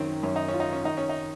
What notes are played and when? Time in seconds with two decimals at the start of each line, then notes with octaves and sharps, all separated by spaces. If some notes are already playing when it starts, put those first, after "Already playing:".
Already playing: F#2 D#3 C4 C#4
0.23 F#2 C#4
0.36 D#4
0.48 C#4
0.54 F4
0.60 D#4
0.73 C#4
0.83 D#3 D#4
0.97 C#4
1.09 D#4